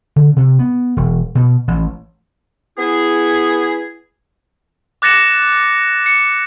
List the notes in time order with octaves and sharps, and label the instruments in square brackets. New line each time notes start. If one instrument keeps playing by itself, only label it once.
[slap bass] D3
C3
B3
E1
B2
A1
[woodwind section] B3 E4 G#4
[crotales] D6 F#6 A6 A#6 C#7 E7
C#7